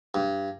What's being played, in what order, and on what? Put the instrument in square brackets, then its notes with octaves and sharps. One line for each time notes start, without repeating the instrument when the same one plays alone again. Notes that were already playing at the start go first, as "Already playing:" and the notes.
[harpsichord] G2